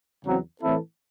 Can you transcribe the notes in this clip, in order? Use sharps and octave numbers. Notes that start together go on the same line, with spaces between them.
E2 C#3 F#3 C4
A2 E3 C4 E4 A4